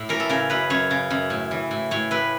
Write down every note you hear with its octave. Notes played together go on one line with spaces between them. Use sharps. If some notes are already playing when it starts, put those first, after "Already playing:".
Already playing: A2
E3 A#4
A4
C#3 A#4
F#2 B4
F#2 C#5
C#3
F#2
A2
E3
A2
A2 C#5
A2 B4